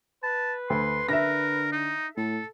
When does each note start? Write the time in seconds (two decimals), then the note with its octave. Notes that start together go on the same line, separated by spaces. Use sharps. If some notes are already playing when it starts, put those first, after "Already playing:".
0.24 B4 A5
0.70 D2 C6
1.09 D3 A#4 E5 A#6
1.72 D#4
2.17 A2 A4